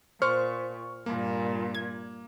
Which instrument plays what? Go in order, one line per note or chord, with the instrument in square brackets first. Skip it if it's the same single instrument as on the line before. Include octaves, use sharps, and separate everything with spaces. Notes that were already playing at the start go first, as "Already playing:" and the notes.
[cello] A#2 [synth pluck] C5 [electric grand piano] C#6 F6 C#7
[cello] G2 A#2 [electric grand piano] A#3
[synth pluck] G#6